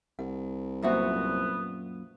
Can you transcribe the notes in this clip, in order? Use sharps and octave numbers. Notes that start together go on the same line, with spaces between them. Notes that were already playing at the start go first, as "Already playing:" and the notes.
C2 F#5
F#2 A#2 B3 F#4 C5 E5 A#5